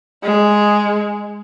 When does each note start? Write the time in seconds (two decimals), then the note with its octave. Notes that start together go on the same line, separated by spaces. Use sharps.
0.23 G#3